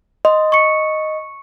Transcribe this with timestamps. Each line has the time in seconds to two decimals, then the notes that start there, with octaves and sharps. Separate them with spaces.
0.25 D#5 C6
0.52 C#6 C#7